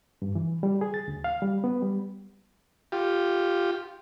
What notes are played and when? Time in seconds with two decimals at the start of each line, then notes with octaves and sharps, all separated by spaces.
0.22 G2
0.35 E3
0.63 G3
0.81 G#4
0.94 A6
1.08 D2
1.24 F5
1.42 G3
1.64 B3
1.82 G3
2.92 F4 G4